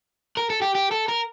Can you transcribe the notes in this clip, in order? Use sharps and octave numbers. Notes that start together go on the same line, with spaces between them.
A#4
A4
G4
G4
A4
A#4